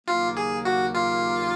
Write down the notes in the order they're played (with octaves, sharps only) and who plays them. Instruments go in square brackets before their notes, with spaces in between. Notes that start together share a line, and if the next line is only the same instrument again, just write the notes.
[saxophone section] D#2 C#3 F#3 A#3 [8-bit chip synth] F4
[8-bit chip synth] G#4
F#4
F4